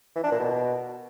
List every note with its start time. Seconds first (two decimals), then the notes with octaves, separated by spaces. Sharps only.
0.16 E3
0.24 D4
0.32 A#2
0.40 B2